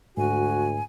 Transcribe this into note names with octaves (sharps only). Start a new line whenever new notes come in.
D2 G#2 F#4 G#5